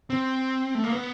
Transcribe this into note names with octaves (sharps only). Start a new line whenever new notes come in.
C4
A3
A#3
B3